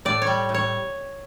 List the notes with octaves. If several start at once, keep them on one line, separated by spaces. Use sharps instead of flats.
A2 D5
C#5
G3
A2
C#5